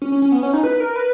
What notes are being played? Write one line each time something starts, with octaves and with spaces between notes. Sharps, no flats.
C#4
C#4
C#4
B3
C#4
D#4
B4
A#4
B4